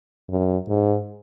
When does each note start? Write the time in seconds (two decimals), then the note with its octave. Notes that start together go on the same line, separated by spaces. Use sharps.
0.29 F#2
0.69 G#2